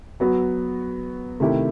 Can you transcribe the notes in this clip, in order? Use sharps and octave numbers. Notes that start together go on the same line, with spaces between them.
F#3 B3 F#4
C3 D#3 A3 E4 G4